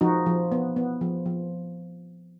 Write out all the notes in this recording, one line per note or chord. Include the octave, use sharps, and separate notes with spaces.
F3 D#4 F#4
F3
B3
B3
F3
F3